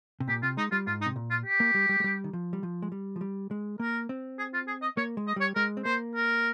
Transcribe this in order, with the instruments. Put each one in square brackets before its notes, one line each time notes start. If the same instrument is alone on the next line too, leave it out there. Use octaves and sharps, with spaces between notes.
[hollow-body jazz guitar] C3
[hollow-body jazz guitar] A#2 [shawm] G4
[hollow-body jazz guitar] C3 [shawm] F4
[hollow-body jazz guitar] G#3 [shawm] D#4
[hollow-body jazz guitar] G3 [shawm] F4
[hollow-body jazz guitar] G#2 [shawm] F4
[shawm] D#4
[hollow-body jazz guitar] C3
A#2
[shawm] F4
G4
[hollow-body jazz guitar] A#3
G3
G3
G#3
G3
D#3
F3
G3
F3
G#3
G3
F3
G3
G#3
[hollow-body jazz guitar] A#3 [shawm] A#4
[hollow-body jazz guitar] C4
[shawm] G#4
F4
G#4
D#5
[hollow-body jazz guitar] A#3 [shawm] C#5
[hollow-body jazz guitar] G#3
[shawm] D#5
[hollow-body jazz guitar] G3 [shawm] C#5
[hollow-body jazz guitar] G#3 [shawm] A#4
[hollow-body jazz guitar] C4
[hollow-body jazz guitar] A#3 [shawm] C5
[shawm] A#4